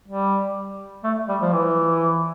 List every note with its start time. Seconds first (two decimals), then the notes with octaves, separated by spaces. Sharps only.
0.08 G3
1.04 A3
1.28 G3
1.41 F3
1.52 E3